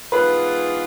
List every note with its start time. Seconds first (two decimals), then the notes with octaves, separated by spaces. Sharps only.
0.12 G#2 E3 B3 F4 G#4 B4